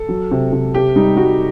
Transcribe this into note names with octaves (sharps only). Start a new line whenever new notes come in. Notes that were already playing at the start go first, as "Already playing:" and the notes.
Already playing: A4
F#3
C3
C3
C3 G4
G3 D#4
G3 F#4